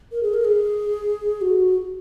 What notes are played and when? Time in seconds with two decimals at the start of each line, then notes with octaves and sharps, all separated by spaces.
0.12 A#4
0.23 G#4
0.34 A#4
0.45 G#4
1.41 F#4